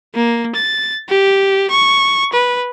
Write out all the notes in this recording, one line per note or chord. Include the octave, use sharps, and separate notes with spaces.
A#3
A6
G4
C#6
B4